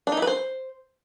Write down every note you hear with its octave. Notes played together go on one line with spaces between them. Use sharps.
D4
D#4
E4
B4
C5